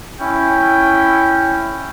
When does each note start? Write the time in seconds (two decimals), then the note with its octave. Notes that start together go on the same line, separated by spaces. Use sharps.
0.21 C#4 E4 G5